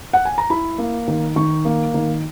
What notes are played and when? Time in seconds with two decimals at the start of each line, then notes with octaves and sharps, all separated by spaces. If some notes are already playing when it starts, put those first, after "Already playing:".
0.13 F#5
0.25 G#5
0.38 A#5
0.50 E4 B5
0.78 A#3
1.08 D#3
1.36 D#3 C#6
1.65 A#3
1.94 D#3